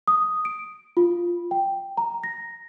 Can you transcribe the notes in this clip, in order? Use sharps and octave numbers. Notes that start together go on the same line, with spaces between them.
D#6
D7
F4
G5
A#5
A#6